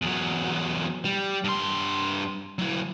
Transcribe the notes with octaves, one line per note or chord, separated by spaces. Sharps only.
E2 F#3
G3
G2 C6
F#3 E4